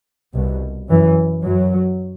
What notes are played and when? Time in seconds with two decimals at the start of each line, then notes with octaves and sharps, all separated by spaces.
0.34 C2 B2
0.89 F#2 E3
1.43 F#2 F#3